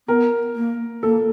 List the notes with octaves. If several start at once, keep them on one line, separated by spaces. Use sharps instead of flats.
B3 A#4
A#3
A#3 A4